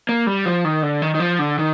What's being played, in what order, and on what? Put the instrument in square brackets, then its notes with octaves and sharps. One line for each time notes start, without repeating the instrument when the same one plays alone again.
[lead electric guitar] A#3
G3
F3
D#3
D3
D#3
D#3
F3
D3
D#3